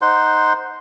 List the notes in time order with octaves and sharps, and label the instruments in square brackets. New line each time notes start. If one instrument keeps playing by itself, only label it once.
[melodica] D#4 C5 F#5 C6